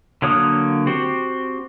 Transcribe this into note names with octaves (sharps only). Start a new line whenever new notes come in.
D3 F#3 A#3 C#5 D#6
C4 F#4 G4